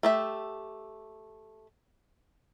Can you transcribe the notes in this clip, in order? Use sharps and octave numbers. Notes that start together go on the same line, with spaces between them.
A3 G4 E5